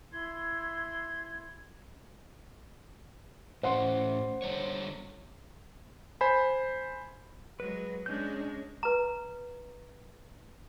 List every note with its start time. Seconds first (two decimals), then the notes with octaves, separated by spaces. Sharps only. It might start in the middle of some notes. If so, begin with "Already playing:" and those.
0.11 E4 C6 G#6
3.63 A2 C#4 C5 F#5 C6
4.42 D3 G3 C#5
6.21 C5 G#5 B5
7.60 F#3 G#3 B4
8.06 G#3 C#4 D4 G6
8.83 B4 A#5